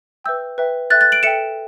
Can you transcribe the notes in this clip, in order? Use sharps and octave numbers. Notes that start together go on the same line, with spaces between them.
B4 E5 G5 E6 G6
B4 E5 G5
A4 E5 G5 F#6 A6
F#6 A6
D7 F#7
A4 E5 G5 C#7 E7